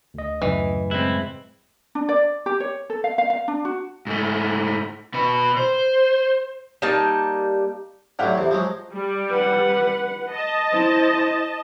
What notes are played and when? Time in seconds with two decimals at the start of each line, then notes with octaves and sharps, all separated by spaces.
0.14 D2 D#5
0.42 F#2 A2 C#3 E3
0.91 G#3 C4 E4 F#6
1.95 D4
2.09 D5
2.46 G4
2.60 C#5
2.90 A4
3.04 F5
3.18 F5
3.30 F5
3.48 D4
3.65 F#4
4.07 G#2 A3
5.14 B2 B4
5.57 C5
6.82 G3 A#3 D#4 A5
8.19 A2 D3 F#3 G4 F5 F#5
8.35 E2 C3
8.51 F3 F#3 G#3
8.93 G3
9.30 B4 F#5
10.33 D#5 A5
10.72 E4 C5